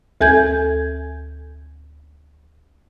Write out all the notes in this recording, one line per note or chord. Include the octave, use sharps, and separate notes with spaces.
D2 A4 G#5 G6 G#6